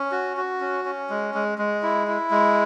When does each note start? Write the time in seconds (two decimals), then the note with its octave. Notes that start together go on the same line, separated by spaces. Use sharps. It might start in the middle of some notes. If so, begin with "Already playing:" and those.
Already playing: C#4
0.12 F#4
0.37 F#4
0.61 C#4
0.85 C#4
1.10 G#3
1.34 G#3
1.58 G#3
1.83 E4
2.07 E4
2.31 G#3